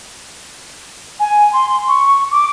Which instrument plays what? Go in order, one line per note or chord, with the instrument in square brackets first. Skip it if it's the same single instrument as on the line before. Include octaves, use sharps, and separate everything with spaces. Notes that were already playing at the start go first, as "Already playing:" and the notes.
[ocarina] G#5
C6
C#6
D6